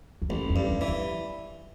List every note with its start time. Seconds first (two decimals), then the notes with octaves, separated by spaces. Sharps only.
0.22 E2
0.29 A1 F2
0.50 F2
0.56 G2
0.68 F2
0.81 E3
0.88 E2